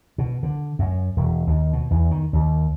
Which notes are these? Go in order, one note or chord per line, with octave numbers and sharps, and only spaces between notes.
B2
D3
F#2
E1
D#2
B2
E2
D#3
D#2